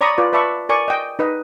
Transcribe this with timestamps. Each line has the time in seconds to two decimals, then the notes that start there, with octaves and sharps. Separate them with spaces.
0.01 C#5 D5 A#5 B5 C#6 D#6
0.18 F4 B4 D5
0.33 B4 D5 E5 A5 B5 C#6
0.69 A#4 D5 G#5 C#6
0.88 D#5 G5
1.19 D#4 B4 D#5